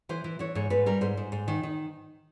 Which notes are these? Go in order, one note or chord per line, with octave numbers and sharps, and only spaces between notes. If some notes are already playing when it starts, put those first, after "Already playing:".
E3 C5
E3
E3 C#5
G#2 C#5
G#2 B4
G3 A#4
G#2 C5
G#2
G#2
D#3
D#3